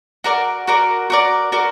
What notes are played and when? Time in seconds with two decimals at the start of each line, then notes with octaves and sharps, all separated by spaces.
0.24 F#4 A#4 D5
0.67 F#4 A#4 D5
1.10 F#4 A#4 D5
1.52 F#4 A#4 D5